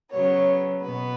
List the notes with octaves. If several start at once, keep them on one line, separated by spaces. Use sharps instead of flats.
C#3 F#3 B3 C#5
B2 B3 B4